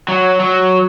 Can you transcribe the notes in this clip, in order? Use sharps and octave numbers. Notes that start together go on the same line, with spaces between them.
F#3
F#3